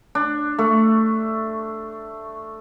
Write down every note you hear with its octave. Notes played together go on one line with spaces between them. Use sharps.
D4
A3